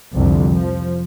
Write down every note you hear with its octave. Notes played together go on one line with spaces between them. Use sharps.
C2 F2 D3
F3